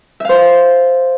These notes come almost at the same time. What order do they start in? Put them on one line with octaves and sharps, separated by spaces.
E5 F5 C5